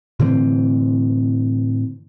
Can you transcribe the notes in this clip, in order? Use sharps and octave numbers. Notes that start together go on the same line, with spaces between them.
A2 D3 E3 C4